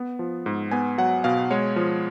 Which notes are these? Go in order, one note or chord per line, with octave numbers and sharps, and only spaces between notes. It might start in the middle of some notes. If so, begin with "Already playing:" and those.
Already playing: B3
F3
G#2
B3 G#5
F#3 F#5
B2 F5
G#3 C#5
F3